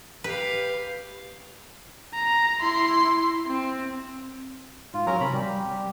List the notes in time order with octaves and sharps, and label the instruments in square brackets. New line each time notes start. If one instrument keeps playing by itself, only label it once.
[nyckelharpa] G4 F5 [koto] B4
[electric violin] A#5
E4 C6
C4
[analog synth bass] G#2 [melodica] F4
[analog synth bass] F#3 [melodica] C#4 A#4 A#5
[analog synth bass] C3 [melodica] B5
[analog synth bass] G3 [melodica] G4